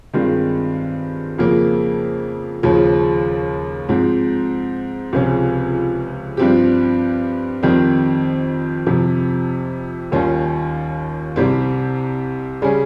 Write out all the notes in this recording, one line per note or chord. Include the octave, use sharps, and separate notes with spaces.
G2 D#3 G#3 C4 F4
F2 C#3 F3 A#3
D#2 C#3 F3
G#2 F3 C4
C#2 C3 F3 G#3 C#4
G2 F3 C4 G4
F2 D#3 G3 C4
F2 C3 F3
D#2 D#3 G3 C#4 F4
C2 C3 G3 C4
C#3 G3 C#4 G#4